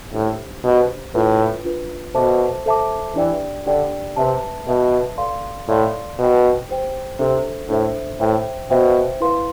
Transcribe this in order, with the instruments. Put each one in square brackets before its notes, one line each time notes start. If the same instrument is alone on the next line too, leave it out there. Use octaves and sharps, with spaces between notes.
[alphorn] A2 [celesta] D4 G4 C5
[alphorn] B2 [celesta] D4 G4 C5
[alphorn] A2 [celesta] D4 F4 B4
[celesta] D4 F4 B4
[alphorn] B2 [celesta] A4 C5 E5 A5 D6
[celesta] A4 C5 E5 A5 D6
[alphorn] E3 [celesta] D4 G4 D5 G5
[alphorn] D3 [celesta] D4 G4 D5 G5
[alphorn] C3 [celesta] B4 E5 A5
[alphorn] B2 [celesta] B4 E5 A5
[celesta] A4 D5 F5 C6
[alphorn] A2 [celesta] A4 D5 F5 C6
[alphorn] B2 [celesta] G4 C5 G5
[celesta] G4 C5 G5
[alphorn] C3 [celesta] D4 A4 C5 E5
[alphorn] A2 [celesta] D4 A4 C5 E5
[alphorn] A2 [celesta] C5 E5 G5
[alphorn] B2 [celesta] C5 E5 G5
[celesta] E4 B4 F5 C6